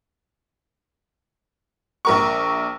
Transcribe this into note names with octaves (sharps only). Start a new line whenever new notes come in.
A#1 A#4 C#6